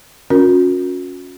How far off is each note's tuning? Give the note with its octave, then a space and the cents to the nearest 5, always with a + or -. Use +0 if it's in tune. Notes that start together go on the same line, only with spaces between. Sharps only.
C#4 +0 F#4 -40 A#4 +0